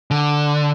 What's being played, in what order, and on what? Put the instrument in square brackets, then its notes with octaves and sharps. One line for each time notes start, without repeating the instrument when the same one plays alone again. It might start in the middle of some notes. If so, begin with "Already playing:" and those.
[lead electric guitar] D3